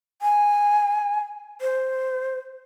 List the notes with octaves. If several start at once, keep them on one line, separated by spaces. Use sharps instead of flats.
G#5
C5